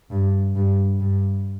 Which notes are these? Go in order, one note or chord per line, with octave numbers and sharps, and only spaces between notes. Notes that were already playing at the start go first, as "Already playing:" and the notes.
G2
G2
G2